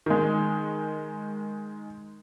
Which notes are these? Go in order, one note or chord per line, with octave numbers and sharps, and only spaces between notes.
D#3 G#3